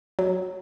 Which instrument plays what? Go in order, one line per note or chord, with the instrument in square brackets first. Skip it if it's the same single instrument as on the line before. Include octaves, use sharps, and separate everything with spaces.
[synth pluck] F#3